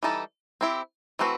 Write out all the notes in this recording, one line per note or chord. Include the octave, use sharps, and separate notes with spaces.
E3 G3 D#4 A4
C4 E4 G4
E3 A3 C4 F#4 B4